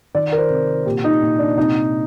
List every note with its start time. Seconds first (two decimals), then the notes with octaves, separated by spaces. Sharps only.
0.15 D#3 D5
0.32 A#4
0.38 C5
0.50 C3
0.86 A#2 G4
1.04 D#4
1.22 A#2
1.39 D4
1.57 C3 D#4